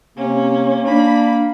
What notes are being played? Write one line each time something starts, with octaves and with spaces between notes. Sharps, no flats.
C3 A#3 C#4
A#3 D4 B5